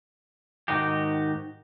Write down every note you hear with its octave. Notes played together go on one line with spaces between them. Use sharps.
G#2 D#3 D#4 F#4 G4